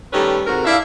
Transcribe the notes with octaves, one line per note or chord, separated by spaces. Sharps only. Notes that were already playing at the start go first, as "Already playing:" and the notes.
D#3 G3 A3 C#4 A4 B4
G#2 C3 F#4 A#4
D4 E4 D5 E5 F5